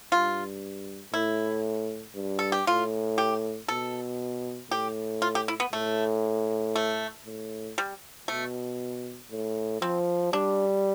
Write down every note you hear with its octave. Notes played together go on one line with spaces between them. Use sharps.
G2 F4
A2 E4
G2
A4
G4
A2 F4
G4
B2 A4
A2 G4
F4
G4
E4
B3
A2 A3
A3
A2
G3
B2 A3
A2
F3 C4
G3 D4